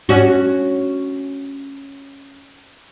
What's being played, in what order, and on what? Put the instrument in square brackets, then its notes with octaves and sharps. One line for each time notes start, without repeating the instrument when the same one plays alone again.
[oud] C#4 F#4